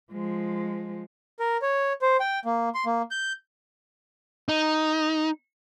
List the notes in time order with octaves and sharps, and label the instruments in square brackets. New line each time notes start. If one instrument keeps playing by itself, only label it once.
[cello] F3 G#3
[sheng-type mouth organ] A#4
C#5
C5
G5
A#3
C6
A#3
G6
[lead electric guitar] D#4